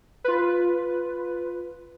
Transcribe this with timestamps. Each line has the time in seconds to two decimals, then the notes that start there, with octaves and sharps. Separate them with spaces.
0.24 F4 B4